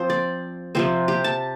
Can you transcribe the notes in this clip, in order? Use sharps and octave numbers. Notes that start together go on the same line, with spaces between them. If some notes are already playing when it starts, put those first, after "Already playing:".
Already playing: F3 C4 C5
D5
C3 F3 C4 C5
G4
A5